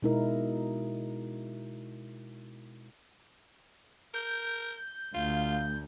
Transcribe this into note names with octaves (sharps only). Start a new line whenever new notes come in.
B2 G#3 D#4 E4 A#4
A#4 G6
D2 F4 F5